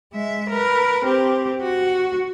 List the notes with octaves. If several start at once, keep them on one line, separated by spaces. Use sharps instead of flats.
G#3 E5
A#4 B4
C4 G4
F#4